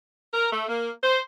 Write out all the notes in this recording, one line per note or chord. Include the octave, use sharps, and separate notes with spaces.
A#4
A3
A#3
C5